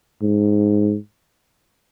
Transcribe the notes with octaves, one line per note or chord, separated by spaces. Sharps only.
G#2